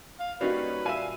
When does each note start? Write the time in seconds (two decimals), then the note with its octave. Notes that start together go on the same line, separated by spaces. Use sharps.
0.19 F5
0.41 G3 A#3 C#4 D#4 F#4 B4 F5
0.85 A#2 E5 F5 G#5 D#7